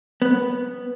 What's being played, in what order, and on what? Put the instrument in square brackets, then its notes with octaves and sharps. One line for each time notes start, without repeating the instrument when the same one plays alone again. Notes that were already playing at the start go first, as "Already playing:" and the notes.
[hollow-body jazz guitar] B3